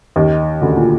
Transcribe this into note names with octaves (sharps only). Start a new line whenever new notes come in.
D#2 D#3
D2 D3
A#2